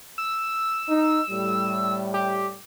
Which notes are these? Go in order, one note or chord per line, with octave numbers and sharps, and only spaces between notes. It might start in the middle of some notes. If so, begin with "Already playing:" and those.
E6
D#4
A2 G3
G4